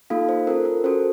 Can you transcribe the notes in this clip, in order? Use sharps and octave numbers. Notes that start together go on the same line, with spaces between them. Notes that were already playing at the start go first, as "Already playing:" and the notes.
A#3 D#4 F4 A4 F5
C5
C#4 F4 A4 A#4
A#4
C#4 F#4 A4 C5